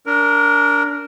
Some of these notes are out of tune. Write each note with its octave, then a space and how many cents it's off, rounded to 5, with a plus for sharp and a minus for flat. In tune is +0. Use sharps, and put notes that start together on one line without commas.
D4 -30 A#4 -5